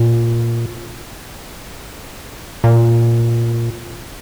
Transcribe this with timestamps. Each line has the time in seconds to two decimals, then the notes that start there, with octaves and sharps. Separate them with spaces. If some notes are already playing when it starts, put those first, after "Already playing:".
Already playing: A#2
2.64 A#2